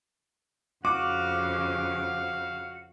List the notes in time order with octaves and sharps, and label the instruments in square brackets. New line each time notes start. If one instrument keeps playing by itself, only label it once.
[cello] F2 C#3 [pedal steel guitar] F#4 [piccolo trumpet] F5 [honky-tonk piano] D6